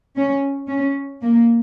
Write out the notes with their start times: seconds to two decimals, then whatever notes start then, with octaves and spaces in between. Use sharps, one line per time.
0.16 C#4
0.69 C#4
1.22 A#3